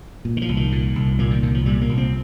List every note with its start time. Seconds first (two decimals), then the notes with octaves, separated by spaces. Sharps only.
0.25 A#2
0.37 D#3
0.42 F3
0.49 C2
0.57 D#3
0.72 A#2
0.96 C2
1.19 A#2 A#3
1.31 D#3
1.43 C2 D#3
1.54 F3
1.66 A#2 G3
1.81 A#3
1.89 C2
1.98 C4